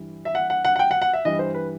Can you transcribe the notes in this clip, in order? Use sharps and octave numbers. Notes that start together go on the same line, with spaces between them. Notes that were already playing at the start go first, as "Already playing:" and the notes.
Already playing: G2 E3 G3
E5
F#5
F#5
F#5
F#5
G5
F#5
F#5
E5
G2 E3 G3 D#5
C5
B4